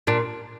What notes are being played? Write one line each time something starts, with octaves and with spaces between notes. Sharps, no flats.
A#2 D4